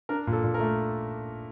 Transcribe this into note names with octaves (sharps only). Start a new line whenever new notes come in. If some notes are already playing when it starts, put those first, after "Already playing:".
D4 A#4
A#2
A4
A#2
A#4
A3